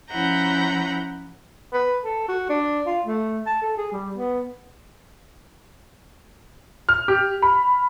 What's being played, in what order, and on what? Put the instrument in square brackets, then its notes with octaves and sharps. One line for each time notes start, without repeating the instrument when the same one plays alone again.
[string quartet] F3 C#4 E4 F#5 A#5 G6
[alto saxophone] B4
A4
F#4
D4
F4
A3
A5
A4
G#4
G3
B3
[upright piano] F6
G4
B5